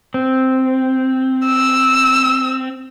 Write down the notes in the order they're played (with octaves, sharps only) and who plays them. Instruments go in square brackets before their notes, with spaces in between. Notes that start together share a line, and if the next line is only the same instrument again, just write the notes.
[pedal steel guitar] C4
[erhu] E6